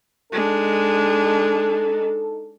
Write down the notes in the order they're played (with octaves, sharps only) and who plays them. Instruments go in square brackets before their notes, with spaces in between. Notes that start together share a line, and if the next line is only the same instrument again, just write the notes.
[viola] G#3 D4 [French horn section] D#4 A4